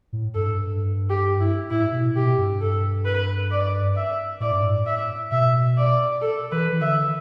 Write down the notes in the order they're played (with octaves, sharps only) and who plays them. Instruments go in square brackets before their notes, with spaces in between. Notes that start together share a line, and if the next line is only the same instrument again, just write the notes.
[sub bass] A2
[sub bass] G2 [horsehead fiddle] A4
[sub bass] G2
[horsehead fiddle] G4
E4
[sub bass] A2 [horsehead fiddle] E4
[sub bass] B2
[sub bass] B2 [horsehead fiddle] G4
[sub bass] G2
[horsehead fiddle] A4
B4
D5
E5
[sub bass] A2 [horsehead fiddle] D5
[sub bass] G2
A2
[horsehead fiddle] E5
[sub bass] B2 [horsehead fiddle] E5
[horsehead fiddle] D5
A4
[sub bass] E3 [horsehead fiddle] B4
[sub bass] E3
[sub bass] D3 [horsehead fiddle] E5